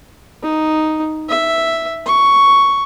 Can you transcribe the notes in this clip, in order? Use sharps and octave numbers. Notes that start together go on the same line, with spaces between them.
D#4
E5
C#6